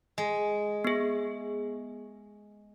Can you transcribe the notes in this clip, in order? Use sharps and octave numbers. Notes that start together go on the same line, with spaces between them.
G#3
B3 G#4